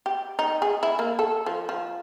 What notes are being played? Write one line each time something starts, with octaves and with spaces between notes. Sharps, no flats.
G4
D#4
G#4
E4
A#3
A4
F3
F3